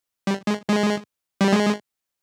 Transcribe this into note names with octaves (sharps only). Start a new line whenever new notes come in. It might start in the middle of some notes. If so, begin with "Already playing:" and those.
G3
G#3
G#3
G3
G#3